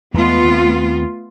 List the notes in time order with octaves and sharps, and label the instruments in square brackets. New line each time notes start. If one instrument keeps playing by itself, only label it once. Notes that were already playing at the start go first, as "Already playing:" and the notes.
[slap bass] E2 G#3 [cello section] A3 B3 F4
[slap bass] D#2 C4